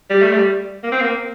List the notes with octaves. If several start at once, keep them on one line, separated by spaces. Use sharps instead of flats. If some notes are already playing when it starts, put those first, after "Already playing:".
G3
A3
G3
A#3
C4
A#3